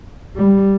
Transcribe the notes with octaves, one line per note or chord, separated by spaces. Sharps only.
G3